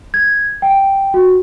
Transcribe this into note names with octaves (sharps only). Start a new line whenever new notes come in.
G#6
G5
F#4